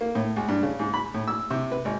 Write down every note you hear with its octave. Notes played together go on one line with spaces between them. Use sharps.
A#3
A2
C#2
G2
C#3
G#2
B5
A2
E6
C3
B4
G#1